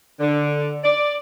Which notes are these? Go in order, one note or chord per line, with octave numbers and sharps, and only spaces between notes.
D3
D5